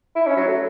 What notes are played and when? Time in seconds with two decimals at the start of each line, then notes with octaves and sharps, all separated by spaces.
0.15 E4
0.26 C#4
0.36 F#3
0.48 A3